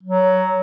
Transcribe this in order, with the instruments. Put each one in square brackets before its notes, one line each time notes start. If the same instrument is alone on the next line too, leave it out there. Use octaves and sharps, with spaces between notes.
[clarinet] F#3